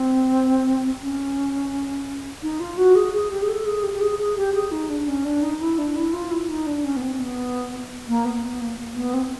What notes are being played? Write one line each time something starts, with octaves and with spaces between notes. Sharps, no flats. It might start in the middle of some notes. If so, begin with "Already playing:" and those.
Already playing: C4
C#4
D#4
F4
F#4
G#4
G#4
G4
G#4
A4
G#4
G4
G4
G#4
G#4
G4
G#4
D#4
D4
C#4
D4
D#4
E4
D4
E4
F4
E4
D#4
D4
C#4
B3
C4
B3
A#3
B3
B3
A#3
A#3
B3
C4